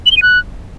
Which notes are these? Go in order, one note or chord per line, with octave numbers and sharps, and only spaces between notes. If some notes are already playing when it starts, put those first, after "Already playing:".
F#7
G7
D#7
F#6